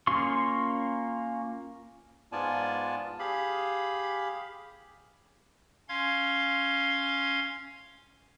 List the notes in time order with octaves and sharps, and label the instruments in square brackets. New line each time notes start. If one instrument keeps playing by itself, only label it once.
[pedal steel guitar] A#3 C#4 F4 C6 C#6
[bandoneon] G#2 B3 F4 D5 G#5 A5
G4 G#4 F5 B5
[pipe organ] C#4 F5 C6 G#6